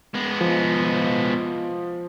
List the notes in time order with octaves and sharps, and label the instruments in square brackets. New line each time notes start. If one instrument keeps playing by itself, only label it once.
[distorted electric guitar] G#3 B3
[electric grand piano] F3